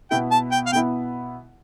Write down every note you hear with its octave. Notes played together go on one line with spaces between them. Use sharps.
B2 B3 E4 G5
A5
G5
F5
B2 B3 E4 G5